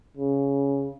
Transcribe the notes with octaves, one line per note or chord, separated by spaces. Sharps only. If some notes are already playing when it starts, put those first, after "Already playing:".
C#3